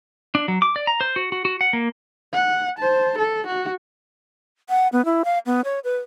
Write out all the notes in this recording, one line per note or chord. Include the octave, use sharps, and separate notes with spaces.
D4
F#3
D6
D5
A#5
C5
F#4
F#4
F#4
F#5
A#3
F#5
C5 A5
A4
F#4
F#5
B3
E4
F5
B3
C#5
B4